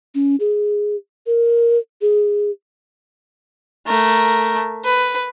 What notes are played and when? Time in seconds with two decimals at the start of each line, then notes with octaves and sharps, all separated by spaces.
0.15 C#4
0.40 G#4
1.27 A#4
2.01 G#4
3.87 A3 A#4
4.84 B4